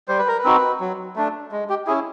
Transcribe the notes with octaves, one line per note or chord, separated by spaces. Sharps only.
G3 C5
B4
A#4
B4
C4 D#4 F#4
F#3
A3 D4
G#3
G4
C#4 E4 G#4